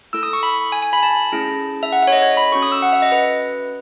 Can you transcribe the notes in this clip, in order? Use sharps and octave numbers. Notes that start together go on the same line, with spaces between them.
A3 E4 A4 E6
D#6
C#6
B5
G#5
G#5
B5
A5
A3 C#4 E4 G#4
E5
F#5
C#5 E5
D#5
C#5
B5
C#4 F#4 A4 C#6
D#6
E6
F#5
E5
D#5
B4